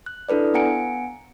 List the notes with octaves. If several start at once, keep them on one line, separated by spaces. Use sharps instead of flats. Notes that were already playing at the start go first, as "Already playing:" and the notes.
F#6
D4 E4 A4 B4 D5
B3 F#5 G#5 A#5 C#7 D7